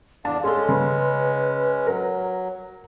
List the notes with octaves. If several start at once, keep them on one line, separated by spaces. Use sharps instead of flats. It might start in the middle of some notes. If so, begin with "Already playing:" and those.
E2 D4 F5 A5
G#3 C#4 G#4 A4 C6
C#3 B4
F#3 A#4